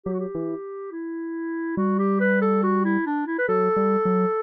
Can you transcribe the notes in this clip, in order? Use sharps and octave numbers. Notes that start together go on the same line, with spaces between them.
F#3 G4
F#4
G4
E3
E4
G3 F#4
G4
B4
A4
F#4
E4
D4
E4
B4
F#3 A4
G3
F#3